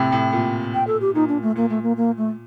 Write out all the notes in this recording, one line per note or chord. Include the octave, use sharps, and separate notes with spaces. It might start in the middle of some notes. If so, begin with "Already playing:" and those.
Already playing: A2 C3 G5
A2
A#2
G5
A4
G4
A#2 D#4
D4
A3
A#2 A#3
A3
A#3
A#3
A3